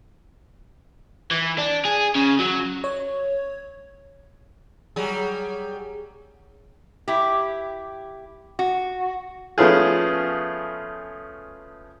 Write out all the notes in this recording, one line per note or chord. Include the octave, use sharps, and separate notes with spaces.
E3
D4
G#4
C#3
F#3
C#5
F#3 G3 G#4
E4 G4
F#4
F3 A3 B3 C#4 F4 G#4